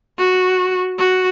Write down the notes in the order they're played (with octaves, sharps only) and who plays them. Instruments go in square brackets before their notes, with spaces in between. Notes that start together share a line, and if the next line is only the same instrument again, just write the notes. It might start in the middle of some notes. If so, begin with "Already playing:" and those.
[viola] F#4
F#4